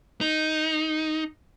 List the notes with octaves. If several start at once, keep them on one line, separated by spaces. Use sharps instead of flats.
D#4